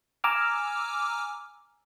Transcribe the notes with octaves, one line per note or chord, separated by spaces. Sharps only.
G#5 A#5 D6 E6 F6